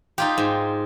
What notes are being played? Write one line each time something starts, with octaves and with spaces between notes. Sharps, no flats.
D#4 F4 G4
G#2